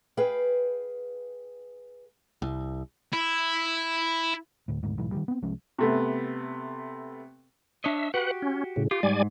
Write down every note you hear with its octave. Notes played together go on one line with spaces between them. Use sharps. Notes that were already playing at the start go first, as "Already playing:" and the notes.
G#4 B4 F5 G5
C2
E4
D2 A2
G#1 D2 G#2
B1 G#2 E3
D#3 E3 G3
B3 C4
C2 F3 G#3 C#4
C3 A3 B3
D4 C#5 D#5 E5
F#4 G4 B4 F#5
C#4
A2 C#3
F4 G4
G#2 G3 D5 G#5